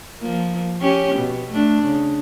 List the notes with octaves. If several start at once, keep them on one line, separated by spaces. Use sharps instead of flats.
F3 A#3
C#4 G4
B2
A3 D4
C#3